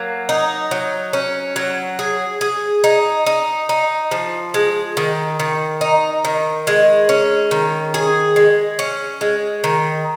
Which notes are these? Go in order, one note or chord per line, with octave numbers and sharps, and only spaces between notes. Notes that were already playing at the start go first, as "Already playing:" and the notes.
Already playing: F#3 A#3
D#4
F#3
C#4
F#3
G#4
G#4
D#4
D#4
D#4
F3
G#3
D#3
D#3
D#4
D#3
G#3
C#4
D#3
G#4
G#3
C#4
G#3
D#3